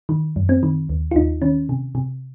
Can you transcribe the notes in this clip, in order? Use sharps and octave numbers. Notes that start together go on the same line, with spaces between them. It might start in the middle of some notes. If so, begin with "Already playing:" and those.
D#3
F#2
C4
D#3
D#2
F4
D#2 D#4
D#3 C#4
C3
C3